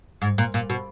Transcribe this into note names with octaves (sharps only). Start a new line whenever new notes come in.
G#2
A#2
A#2
B2